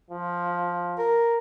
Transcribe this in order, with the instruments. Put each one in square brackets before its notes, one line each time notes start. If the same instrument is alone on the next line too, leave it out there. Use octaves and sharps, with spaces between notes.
[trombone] F3
[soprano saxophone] A#4